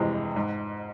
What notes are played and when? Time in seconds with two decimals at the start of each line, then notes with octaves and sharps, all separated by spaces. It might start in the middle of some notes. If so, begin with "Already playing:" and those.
Already playing: G1 F2 C3 E3 G#3
0.36 G#2